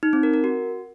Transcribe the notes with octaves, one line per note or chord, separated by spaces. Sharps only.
D#4
C4
A#4
A#4
F#4